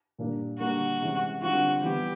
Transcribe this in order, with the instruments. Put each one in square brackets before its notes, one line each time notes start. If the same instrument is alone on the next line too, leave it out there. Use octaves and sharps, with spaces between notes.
[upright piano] A#2 G3 A#3 D4
[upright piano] D3 G3 A#3 [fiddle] F#4
[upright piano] C3 E3 G#3 C#4
[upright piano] D3 G3 C4 F4 [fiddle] F#4
[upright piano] E3 G3 B3 [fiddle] G4